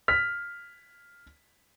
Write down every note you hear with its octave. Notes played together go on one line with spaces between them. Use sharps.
F6 B6